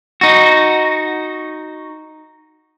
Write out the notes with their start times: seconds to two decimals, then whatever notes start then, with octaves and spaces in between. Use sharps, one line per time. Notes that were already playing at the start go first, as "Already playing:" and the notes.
0.21 D#4 F#4